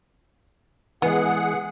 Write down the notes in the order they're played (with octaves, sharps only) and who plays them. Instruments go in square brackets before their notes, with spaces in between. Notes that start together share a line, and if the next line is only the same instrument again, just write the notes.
[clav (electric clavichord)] E3 G#3 [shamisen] B3 [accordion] G#4 F#5